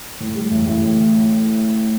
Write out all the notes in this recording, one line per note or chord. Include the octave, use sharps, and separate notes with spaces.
A2
G3
A1
A1
A2